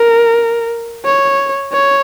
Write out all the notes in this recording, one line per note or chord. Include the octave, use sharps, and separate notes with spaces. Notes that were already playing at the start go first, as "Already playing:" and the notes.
Already playing: A#4
C#5
C#5